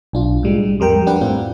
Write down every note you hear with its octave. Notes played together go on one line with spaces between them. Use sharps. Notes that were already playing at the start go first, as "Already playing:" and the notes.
B1 D4 F4
A2 G3 G#3
F2 G3 A#4 G5
G3 D4 G4 B4 F#5
A2 C4 F4